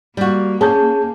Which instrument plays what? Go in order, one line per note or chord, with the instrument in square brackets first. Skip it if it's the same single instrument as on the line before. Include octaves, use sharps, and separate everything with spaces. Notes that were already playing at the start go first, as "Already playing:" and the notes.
[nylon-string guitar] G3 F#4 [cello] A#3
[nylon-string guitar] C#4 [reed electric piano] G#4 A5 G6